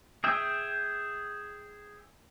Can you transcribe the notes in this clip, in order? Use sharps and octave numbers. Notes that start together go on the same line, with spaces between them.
G#4 E5 G5